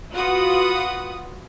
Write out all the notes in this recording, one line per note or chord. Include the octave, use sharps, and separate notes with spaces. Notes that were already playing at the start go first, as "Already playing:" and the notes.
F4 F#4 B4 F#5 D#6